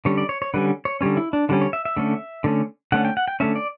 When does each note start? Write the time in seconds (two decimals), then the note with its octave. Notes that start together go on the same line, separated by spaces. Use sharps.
0.05 D3 G3 C#4 C#5
0.18 D5
0.29 C#5
0.42 C#5
0.54 D3 G3 C#4 B4
0.85 C#5
1.01 D3 G3 C#4 C#5
1.17 E4
1.33 D4
1.49 D3 G3 C#4 D4
1.61 C#5
1.73 E5
1.85 E5
1.97 D3 A3 C#4
2.44 D3 A3 C#4
2.92 D3 A3 C#4 F#5
3.05 G5
3.17 F#5
3.28 G5
3.40 D3 A3 C#4 E5
3.55 D5